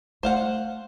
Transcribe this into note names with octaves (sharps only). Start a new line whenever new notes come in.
A3 C5 F5 F#5